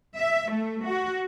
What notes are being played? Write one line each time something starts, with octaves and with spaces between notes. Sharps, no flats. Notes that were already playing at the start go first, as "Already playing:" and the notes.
E5
A3
F#4